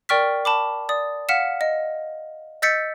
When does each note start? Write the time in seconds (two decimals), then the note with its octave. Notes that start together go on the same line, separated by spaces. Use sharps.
0.09 A#4 D5 G5 C#6 F6 B6
0.45 A5 B5 D6
0.89 D5 D#6
1.29 F5 F#5 F6 B6 C#7 E7
1.61 D#5
2.62 D#5 E6 G6 A6 B6 C#7